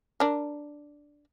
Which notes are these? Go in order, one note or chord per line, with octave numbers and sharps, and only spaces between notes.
D4 A#4